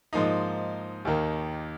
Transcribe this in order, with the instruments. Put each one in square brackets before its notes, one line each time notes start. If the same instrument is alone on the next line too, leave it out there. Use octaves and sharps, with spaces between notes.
[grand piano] G#2 F3 A#3 D#4
D#2 D#3 A#3